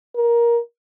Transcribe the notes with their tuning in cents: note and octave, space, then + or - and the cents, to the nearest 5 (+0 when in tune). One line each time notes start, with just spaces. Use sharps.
A#4 +15